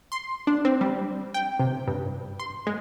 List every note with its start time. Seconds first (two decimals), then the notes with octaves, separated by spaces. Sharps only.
0.12 C6
0.47 D4
0.65 C4
0.81 G3
1.34 G5
1.59 C3
1.88 G2
2.39 C6
2.67 G#3